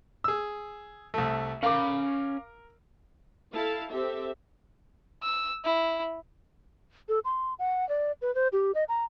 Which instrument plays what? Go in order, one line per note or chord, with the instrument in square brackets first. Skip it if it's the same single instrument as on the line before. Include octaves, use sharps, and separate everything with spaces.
[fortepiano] G#4 E6
C2 A3
[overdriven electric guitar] C#4 B5 [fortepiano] A#4 [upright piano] F5 D6
[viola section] E4 A4 F5 A5
C4 G4 A4 E5
[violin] E6
E4
[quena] A4
C6
F#5
D5
B4
C5
G4
D#5
A#5